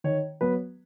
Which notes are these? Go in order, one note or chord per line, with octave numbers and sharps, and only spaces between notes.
D#3 C#5
F#3 B3 B4